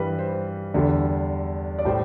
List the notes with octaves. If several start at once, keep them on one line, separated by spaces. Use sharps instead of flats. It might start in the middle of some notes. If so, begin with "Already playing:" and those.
Already playing: G2 E3 G3 B4
C5
E2 D3 G3
D5
A2 G3 C5